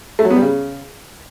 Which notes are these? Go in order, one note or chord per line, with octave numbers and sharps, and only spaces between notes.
A3
F#3
B3
G3
C#3